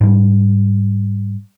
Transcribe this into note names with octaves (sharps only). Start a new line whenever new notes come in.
G#2 G3